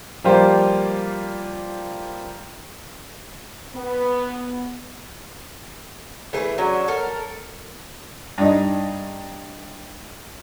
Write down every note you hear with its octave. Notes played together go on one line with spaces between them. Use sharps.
F3 G3 A#3 F4 G4 C5
B3
E3 A3 G#4 B4
F#3 C#4 D4
A4 A#4
G2 D#4